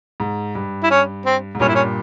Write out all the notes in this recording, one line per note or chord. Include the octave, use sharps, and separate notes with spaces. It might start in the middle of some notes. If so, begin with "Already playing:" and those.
G#2
G2
E4
C#4
C4
G#2
G2 A#2 C#4
E4
C#4